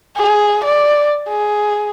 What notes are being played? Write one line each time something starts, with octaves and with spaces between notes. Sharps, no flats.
G#4
D5
G#4